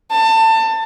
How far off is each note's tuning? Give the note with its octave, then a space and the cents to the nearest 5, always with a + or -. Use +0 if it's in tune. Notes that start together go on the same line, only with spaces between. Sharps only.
A5 +25